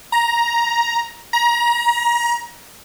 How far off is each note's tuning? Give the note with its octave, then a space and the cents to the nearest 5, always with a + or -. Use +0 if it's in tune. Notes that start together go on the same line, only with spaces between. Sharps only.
A#5 +10
A#5 +30